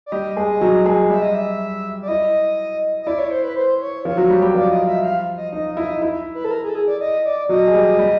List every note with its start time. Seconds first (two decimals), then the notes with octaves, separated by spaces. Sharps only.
0.06 D5
0.12 G3 G4 D#5
0.36 G#3 G#4
0.61 F#3 F#4
0.86 G#3 G#4
1.10 G3 G4 E5
1.22 D#5
1.35 E5
2.02 D5
2.08 E4 D#5
3.02 D#5
3.07 E4 D5
3.19 C#5
3.31 C5
3.44 B4
3.56 C5
3.81 C#5
4.05 F3 F4 C#5
4.17 F#3 F#4
4.30 G3 G4
4.42 G3 G4
4.55 F3 F4 D5
4.71 D#5
4.87 E5
5.03 F5
5.37 D#5
5.52 D#4 D#5
5.77 E4 D#5
6.02 E4
6.35 B4
6.45 A4
6.51 A#4
6.64 G#4
6.69 A4
6.75 G#4
6.88 D5
7.01 D#5
7.25 D5
7.49 F#3 F#4 D#5
7.67 G#4
7.74 G3 G4
7.99 G3 G4